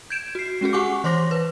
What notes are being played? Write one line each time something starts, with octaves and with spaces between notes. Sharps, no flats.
G6 G#6 D7 E7
F#4 C7
G#3 C#4 F#4 G#4
G4 F#5 G#5 C#6 D6
E3 C5 C#5 C6 D6 A#6
B4